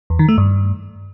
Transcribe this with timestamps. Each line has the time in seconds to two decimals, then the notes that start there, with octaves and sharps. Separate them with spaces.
0.10 E2
0.19 D#3
0.28 A3
0.38 G2